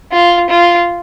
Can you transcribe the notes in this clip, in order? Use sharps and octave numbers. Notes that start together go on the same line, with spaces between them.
F4
F4